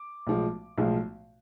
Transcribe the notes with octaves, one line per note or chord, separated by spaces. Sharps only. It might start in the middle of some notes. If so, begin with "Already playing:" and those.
Already playing: D6
B1 A2 F3 G#3
B1 A2 F3 G#3